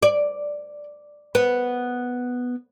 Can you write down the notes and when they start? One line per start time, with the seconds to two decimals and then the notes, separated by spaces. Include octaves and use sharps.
0.02 D5
1.35 B3